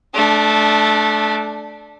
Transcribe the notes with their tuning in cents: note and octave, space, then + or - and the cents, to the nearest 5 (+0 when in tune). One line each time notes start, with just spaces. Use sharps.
A3 -20 D4 +0